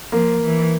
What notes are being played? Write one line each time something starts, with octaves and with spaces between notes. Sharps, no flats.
F3 A#3
E3